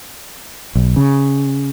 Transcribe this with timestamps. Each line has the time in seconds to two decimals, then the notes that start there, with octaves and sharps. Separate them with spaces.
0.75 B1
0.96 C#3